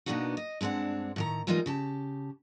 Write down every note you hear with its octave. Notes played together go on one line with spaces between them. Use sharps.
B2 A#3 B3 D4 D#4 F#4
D#5
G2 G#3 C4 D4 F#5
A2 D#3 A#5
E3 G3 G#3 D#4 F4 A#4
C#3 G4 A5